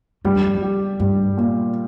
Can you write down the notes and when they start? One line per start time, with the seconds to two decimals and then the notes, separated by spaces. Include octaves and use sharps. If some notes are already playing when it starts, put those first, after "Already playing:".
0.24 G2 G3
0.35 F2
0.55 F2
0.62 G4
1.00 G2 G3
1.37 A#2